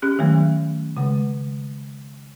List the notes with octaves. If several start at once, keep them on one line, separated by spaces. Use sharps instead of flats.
C#4 G4 F#6
D#3 F#3 G3 A3
C#3 G#3